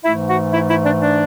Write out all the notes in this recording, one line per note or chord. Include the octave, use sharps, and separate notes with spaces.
G#2 E3 A3 E4 E5
F#4 F#5
E4 E5
E4 E5
D4 D5
D4 D5